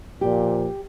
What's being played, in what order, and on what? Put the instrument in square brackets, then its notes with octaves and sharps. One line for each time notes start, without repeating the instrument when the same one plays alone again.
[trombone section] A#2 F3 [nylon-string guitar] G4